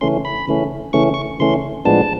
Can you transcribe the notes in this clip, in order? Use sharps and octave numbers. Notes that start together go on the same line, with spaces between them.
C#3 E3 A3 C#4 C6
B5
C#3 E3 A3 C#4
C#3 E3 A3 C#4 C#6
C#6
C#3 E3 A3 C#4 C6
A2 F3 G#3 B3 D4 A5